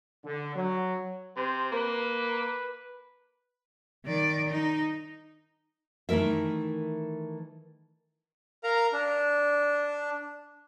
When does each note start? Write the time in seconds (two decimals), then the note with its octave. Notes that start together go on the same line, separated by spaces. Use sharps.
0.25 D3
0.55 F#3
1.36 C3 C5
1.72 A#3 B4
4.06 D#3 D5
4.49 D#4
6.09 D#3 E3 A3 A#4 E5
8.64 A#4 F5 A#5
8.93 D4